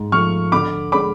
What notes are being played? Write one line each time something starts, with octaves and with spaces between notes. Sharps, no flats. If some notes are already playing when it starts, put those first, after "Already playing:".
Already playing: G#2
F3 A3 C#6 F6
D3 B5 D6
G#3 C#4 B5 D6